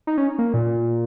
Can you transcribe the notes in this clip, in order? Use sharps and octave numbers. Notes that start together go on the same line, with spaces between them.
D#4
C#4
A#3
A#2